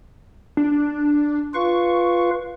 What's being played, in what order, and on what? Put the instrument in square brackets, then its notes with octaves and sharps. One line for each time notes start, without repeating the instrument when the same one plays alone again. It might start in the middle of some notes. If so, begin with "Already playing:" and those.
[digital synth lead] D4
[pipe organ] F4 B4 F5 [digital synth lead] C#6